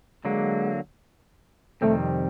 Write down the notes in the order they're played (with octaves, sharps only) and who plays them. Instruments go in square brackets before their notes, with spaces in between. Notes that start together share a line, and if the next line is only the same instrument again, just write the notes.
[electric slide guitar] D3 F#3 A#3 [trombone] G#3
[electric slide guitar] F2 C3 D#3 G3 C4 [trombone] A3